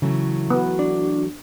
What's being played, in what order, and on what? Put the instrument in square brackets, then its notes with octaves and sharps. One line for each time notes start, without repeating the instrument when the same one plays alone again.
[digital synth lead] C#3 [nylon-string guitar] E3 F#3 A3
[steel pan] B3 [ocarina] F#4
[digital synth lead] D4